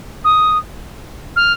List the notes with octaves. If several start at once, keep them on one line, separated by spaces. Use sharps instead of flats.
D#6
F6